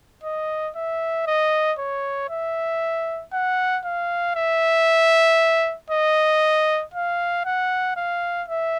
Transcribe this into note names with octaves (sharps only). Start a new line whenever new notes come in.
D#5
E5
D#5
C#5
E5
F#5
F5
E5
D#5
F5
F#5
F5
E5